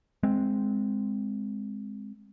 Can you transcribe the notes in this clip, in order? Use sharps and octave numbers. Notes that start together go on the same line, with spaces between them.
G#3 C4